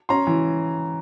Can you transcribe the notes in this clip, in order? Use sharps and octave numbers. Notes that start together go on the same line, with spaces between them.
C#4 A#5 C6
E3